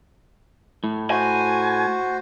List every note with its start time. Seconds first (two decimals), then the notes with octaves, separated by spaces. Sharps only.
0.84 A2
1.10 F#4 C5 G#5